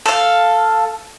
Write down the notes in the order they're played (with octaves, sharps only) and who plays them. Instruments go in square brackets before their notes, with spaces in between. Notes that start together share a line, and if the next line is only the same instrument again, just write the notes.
[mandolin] A4 F5